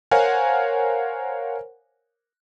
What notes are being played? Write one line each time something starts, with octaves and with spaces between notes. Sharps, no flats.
A#4 C5 C#5 F5 F#5 G#5